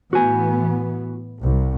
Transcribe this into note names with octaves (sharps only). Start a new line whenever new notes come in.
A2 E3 B3 F#4 G#5
C2